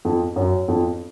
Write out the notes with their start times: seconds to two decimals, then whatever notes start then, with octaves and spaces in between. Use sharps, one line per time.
0.05 F2
0.36 F#2
0.68 F2